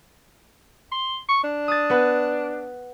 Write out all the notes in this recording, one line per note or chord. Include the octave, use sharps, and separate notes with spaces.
C6
C#6
D4
D#6 A6
B3 B4